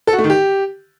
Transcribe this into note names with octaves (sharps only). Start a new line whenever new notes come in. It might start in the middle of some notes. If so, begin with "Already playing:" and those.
A4
F#4
A3
D#3
G4